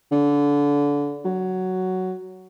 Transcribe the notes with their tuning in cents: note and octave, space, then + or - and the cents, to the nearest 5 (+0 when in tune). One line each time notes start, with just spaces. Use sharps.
D3 -25
F#3 +5